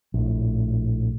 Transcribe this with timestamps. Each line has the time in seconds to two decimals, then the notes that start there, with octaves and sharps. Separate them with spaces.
0.14 A#1 A2